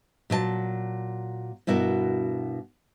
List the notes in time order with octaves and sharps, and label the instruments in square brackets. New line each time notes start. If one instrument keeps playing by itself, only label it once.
[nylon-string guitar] A#2 F#3 C5 A5
G2 B2 E4 F#4 A#4